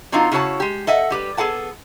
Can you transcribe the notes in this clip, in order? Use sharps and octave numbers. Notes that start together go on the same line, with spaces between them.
F#3 C4 D4 D#4 F4
C#3 E4 F#4 C#5 A5
G#3 G4
A4 D#5 E5 F#5
G3 G4 B4
B3 G#4 A4 F#5 A5